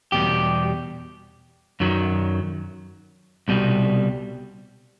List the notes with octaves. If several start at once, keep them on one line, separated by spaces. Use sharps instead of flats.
E2 B2 G3 G4
F#2 D#3 F#3
C2 B2 G3